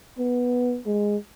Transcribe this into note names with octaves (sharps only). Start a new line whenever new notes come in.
B3
G#3